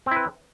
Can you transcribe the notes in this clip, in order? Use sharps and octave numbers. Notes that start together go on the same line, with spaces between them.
C4 E4 B4